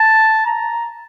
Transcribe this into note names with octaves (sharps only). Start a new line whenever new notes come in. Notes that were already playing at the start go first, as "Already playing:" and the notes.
Already playing: A5
A#5